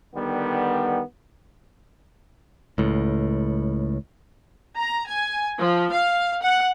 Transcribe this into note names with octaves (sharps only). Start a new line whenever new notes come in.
D3 D#3 G3 B3
C#2 A2
A#5
G#5
F3
F5
F#5